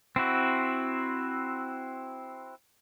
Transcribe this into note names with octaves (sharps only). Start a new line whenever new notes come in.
C4 E4 F#4